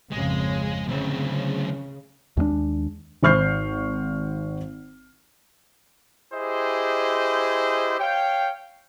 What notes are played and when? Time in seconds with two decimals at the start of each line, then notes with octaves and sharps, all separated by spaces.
0.12 G#1 F2 C#3 G#3
0.88 D2 C#3 C4
2.37 D#2 G#3 A#3 D4
3.23 G#1 C5 C#6 F6 G6 C7
6.33 E4 G4 G#4 C5 D#5
7.99 C#5 F5 G5